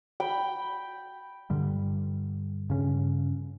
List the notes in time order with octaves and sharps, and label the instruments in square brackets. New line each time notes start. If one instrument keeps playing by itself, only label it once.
[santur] G5 B5
[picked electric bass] G2 D3 G3
G2 C#3 C#4